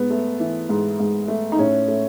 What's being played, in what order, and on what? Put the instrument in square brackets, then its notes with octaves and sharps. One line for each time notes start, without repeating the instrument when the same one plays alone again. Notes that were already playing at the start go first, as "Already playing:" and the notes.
Already playing: [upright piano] G#2 B3
A3
E3
G#2
G#2
A3
D#4
A2 C#4
A3